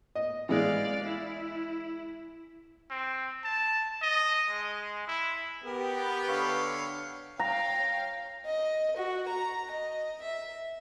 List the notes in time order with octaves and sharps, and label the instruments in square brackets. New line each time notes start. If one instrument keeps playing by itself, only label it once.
[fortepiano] D#5
[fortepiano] E3 G#3 [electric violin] D5 F5
[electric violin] E4
[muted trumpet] C4
A5
D#5
G#3
E4
[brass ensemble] B3 G4 [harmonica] A#4
[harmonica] D3 C#5 F5
[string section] C#5 F5 G5 [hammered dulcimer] A#5
[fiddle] D#5
F#4
A#5
D#5
E5